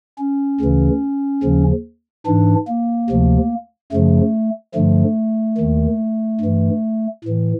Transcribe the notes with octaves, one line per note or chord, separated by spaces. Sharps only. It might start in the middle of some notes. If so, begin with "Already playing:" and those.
C#4
D2 C#3 E3
D#2 C#3 F3
G#2 E3 D4
A#3
D2 C3 F3
F#2 C#3 F3 A3
G2 D3 F3 A3
D#2 D#3
G2 E3
A2 E3